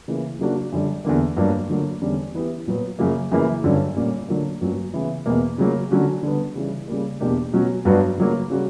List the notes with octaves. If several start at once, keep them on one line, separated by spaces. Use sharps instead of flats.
C#3 E3 A#3
C#3 F#3 A#3 D4 F#4
F#2 D3 G3
E2 D3 A#3
G2 F#3 A#3 D4
D3 F#3 A#3
E2 D3 G3 C#4
E3 B3 E4 G4
A#2 F#3 B3
F#2 C#3 F#3 A#3
F#2 C#3 E3 A#3 E4
G2 D3 F#3 C#4
A#2 G3 A#3 C#4
D3 F#3 A#3
G2 F#3 A#3 C#4 F#4
C#3 E3 B3 E4
E2 B2 A#3
C#3 F#3 A#3
D3 F#3 C#4 F#4
D3 G3 B3
C#3 E3 G3
C#3 G3 A#3
E2 B2 A#3 D4 G4
B2 F#3 C#4 F#4
G2 F#3 B3 D4 F#4
C#3 F#3 A#3
C#3 G3 C#4 F#4